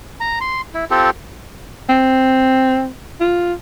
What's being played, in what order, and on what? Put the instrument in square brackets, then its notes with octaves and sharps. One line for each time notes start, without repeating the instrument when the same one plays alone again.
[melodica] A#5
C6
E4
C4 F4 G4 A4
[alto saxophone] C4
F4